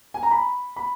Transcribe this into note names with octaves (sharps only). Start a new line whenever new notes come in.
G#5
A#5
B5
B5